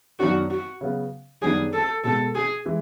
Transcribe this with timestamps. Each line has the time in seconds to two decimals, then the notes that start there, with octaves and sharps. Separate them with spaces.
0.19 F#2 D#3 F#3 B3 D4 F#4
0.50 F#4
0.81 C#3 F#3 B3
1.42 F#2 D#3 G3 B3 D4 G#4
1.73 A4
2.04 B2 G#3 B3 A4
2.35 G#4
2.66 E3 G#3